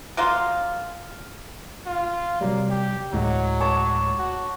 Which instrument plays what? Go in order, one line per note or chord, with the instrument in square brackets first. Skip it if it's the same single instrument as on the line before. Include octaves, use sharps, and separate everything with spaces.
[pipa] F#3 G#3 A#3 F4
[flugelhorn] F4
[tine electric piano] C3 F#3 G3 [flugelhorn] A#3
[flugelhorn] G4
[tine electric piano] D2 A2 G#3 [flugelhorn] F#3
[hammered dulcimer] C#5 A5 D6
[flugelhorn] F#4